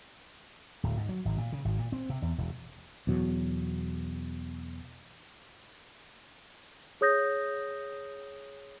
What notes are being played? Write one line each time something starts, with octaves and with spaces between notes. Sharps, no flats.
D1
G#2
F#3
G#1
A#2
C#3
G#1
A#2
C4
C3
E2
E1
E2 B2 F#3
G#4 C#5 D#6 G6 A#6